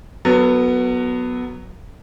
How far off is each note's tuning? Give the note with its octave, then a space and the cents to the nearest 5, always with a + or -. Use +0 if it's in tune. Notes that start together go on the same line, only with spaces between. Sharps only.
F#3 +0 B3 +0 A4 +40